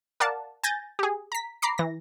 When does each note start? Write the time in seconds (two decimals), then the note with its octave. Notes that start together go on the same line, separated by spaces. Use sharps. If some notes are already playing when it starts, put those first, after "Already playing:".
0.20 A#4 D5 F5 F#5 A5
0.63 G#5 G6 A6 A#6
0.99 G4 G#4
1.32 A#5 B6
1.62 A#5 B5 D6 C7
1.78 E3 A#6